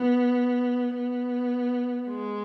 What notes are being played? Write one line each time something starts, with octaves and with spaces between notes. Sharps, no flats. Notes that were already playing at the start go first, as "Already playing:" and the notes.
Already playing: B3
B3
G#3